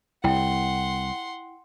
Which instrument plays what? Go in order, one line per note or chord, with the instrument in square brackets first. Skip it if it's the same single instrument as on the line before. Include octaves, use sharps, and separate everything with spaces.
[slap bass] C2 [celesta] E4 G5 [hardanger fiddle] F#5 C6